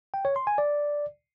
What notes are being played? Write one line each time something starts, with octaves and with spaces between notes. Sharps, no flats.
G5
C#5
C6
G#5
D5